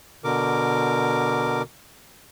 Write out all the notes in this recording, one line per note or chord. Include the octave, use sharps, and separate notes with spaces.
B2 D3 A#4 D6